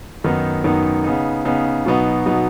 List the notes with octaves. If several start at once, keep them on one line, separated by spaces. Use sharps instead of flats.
F#2 D#3 B3 D#4
F#2 D#3 B3 D#4
C#3 B3 D#4
C#3 B3 D#4
B2 F#3 B3 D#4
B2 F#3 B3 D#4